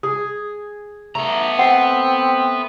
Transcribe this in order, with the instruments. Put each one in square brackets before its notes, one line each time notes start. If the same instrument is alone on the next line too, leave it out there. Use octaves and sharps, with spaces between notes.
[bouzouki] G#4 [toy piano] D#6
[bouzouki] A3 [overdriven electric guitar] B3 A#5
[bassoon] C4 [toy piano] F#5